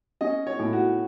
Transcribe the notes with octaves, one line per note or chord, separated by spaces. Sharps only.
C#4 D#5
C#5
A2
F#4